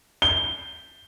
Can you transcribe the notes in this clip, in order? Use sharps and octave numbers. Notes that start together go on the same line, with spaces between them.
G7